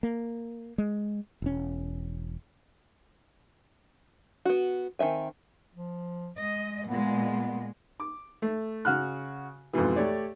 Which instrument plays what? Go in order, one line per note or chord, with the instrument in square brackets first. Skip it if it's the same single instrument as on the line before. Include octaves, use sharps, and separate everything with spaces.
[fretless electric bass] A#3
G#3
E1 C#4
[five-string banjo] B3 F#4
D#3 C4 E5 G#5
[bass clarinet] F3
[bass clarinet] G#3 [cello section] D#5
[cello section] A#2 G#3 [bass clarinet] B3
[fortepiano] D6
A3
C#3 F#4 F6 F#6
F2 G#2 B2 E3
A3 G4 C#5 D5